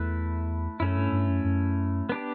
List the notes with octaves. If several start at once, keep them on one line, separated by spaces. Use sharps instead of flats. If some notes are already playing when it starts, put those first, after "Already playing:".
Already playing: E2 A3 E4 B4
F#2 A3 C#4 E4
G2
G2
F#2
F#2
B3 D4 G4